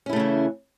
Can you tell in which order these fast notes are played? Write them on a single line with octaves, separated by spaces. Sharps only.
C#4 E4 A3 C#3 E3